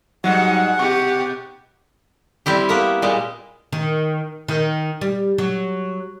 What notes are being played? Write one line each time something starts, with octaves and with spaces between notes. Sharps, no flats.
G#2 F#3 G3 D#4 F#5
B2 G4 C#6
G3 C4 E4 G4
A#3 B3 A#4 E5
A#2 G3 G#3
D#3
D#3
G3
F#3